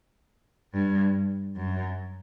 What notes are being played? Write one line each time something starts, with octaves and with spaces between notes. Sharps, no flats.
G2
F#2